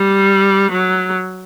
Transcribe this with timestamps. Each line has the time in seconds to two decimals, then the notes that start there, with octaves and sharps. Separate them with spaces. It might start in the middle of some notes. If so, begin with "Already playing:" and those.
Already playing: G3
0.71 F#3